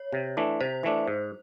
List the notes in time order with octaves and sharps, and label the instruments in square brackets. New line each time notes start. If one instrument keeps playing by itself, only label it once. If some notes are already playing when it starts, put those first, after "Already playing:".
Already playing: [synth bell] C#5
[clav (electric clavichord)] C3
E3 A3 D4
[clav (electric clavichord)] C3 [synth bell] C5
[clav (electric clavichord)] E3 A3 D4
G#2